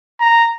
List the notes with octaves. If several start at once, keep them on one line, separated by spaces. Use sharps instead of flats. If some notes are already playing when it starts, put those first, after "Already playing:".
A#5